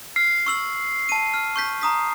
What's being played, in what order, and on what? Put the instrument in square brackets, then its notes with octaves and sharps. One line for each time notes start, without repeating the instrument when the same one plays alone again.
[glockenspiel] F6 [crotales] C7
[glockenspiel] C#6 E6 F#7
A5 D#7
F6
C#6 G6 B6
A#5 D#6 B6